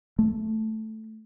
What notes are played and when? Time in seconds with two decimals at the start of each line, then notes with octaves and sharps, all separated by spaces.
0.19 A3